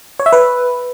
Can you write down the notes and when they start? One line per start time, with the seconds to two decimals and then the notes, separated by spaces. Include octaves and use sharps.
0.19 C#5
0.26 E5
0.33 B4